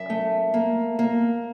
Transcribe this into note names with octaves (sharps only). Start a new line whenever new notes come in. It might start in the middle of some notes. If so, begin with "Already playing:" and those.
Already playing: F#2 E5
A3
A#3
A#3